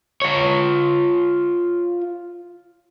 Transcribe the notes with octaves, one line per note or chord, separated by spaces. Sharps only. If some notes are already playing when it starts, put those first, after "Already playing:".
F4 C#5